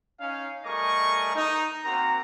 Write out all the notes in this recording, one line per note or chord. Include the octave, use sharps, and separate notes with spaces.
C#4 D#4 F5
G3 A3 G#4 A#4 D#5 C#6
D#4
A#3 C4 F#4 A#4 A#5